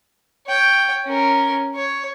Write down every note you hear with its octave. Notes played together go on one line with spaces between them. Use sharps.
C#5 G5
C#4 A#4
C#5